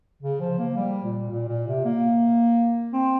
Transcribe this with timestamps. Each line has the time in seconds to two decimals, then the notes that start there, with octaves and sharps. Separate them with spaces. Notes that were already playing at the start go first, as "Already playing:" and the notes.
0.22 C#3
0.41 F3
0.58 A#3
0.76 G3
1.04 A#2
1.31 A#2
1.49 A#2
1.67 C3
1.85 A#3
2.94 C4